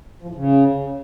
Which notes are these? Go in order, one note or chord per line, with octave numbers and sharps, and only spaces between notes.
F3
A2
C#3